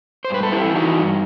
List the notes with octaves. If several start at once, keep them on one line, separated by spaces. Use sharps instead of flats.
C5
G2 B4
A4
E4 G4
E3
D#4 F#4
G2